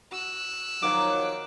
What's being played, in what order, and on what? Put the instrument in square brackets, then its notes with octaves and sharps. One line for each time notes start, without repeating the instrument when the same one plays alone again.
[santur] F#4 [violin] E6 F#6
[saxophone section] D#3 F3 F#3 [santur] A#3 A#4 D#5 [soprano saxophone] D6